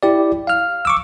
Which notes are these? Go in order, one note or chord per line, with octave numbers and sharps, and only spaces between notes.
E4 G4 D5
F5 F6
C#6 D6 E6